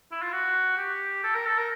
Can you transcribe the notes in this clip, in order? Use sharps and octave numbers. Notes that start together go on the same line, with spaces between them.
E4
F4
F#4
G4
A4
A#4
A4
A#4